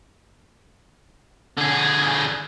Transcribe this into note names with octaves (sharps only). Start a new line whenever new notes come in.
D3 G#4